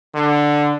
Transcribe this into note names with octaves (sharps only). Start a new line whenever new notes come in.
D3